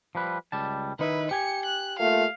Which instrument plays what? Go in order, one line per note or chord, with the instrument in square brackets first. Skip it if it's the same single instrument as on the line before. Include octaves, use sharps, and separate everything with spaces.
[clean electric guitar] F3 G3 B4
C#2 G3 A5
[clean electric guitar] D#3 D#4 E4 [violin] B4
[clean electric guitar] G4 G#5 [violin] C#7
[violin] F#6
[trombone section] A3 A#3 F4 [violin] F5